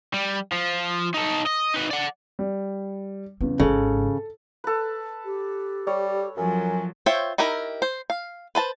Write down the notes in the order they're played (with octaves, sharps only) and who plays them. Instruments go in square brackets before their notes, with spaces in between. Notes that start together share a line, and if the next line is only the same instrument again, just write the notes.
[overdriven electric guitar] G3
F3
D#4 A4
D#5
D#4 B4
D5 F#5
[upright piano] G3
[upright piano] E2 C#3 [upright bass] G3 A#3
[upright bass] G#1 G#2 [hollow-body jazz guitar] C#3 [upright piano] A4
[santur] A4 B4
[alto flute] G4
[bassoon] G3 [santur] C#5
[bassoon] F#2 [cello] F3 F#3 [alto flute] G#5
[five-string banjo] F4 C5 C#5 E5 G5
D#4 E4 G4 A#4
C5
F5
B4 C5 A5